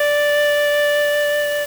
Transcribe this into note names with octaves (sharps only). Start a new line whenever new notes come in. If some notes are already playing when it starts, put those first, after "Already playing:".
Already playing: D5